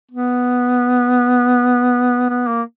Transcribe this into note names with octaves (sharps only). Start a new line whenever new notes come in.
B3
B3
A#3